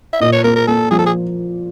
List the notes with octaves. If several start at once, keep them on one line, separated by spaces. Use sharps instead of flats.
E5
A#2 D#5
C#5
A#3 A#4
A#4
A#3 A4
F3 G#4
A4
G#4